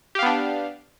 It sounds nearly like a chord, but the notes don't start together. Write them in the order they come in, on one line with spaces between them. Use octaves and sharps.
G4 F5 B3 D4